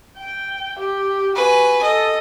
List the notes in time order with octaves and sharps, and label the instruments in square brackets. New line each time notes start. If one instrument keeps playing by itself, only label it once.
[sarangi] G5
G4
[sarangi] F#4 [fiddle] B4 G#5
[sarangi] A4 [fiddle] D#5